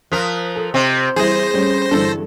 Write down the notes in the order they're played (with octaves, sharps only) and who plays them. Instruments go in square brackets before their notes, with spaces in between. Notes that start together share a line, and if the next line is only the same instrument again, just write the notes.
[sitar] F3 A#4 [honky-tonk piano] D#6 F#6 B6
[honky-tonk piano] A4
[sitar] C3 C4 [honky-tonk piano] D#5
[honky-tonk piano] E3 G3 E4 [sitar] G#4 [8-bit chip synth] C5 A#6
[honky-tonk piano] G3 A3 C#4
[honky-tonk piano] G2 D3 E3 [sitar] A4